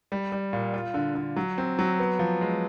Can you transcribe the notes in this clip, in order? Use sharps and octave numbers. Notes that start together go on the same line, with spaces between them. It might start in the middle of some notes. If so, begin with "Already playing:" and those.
G3
G3
A#2
F4
D3
D3
F#3
C4
F#3
B3
F3
G#3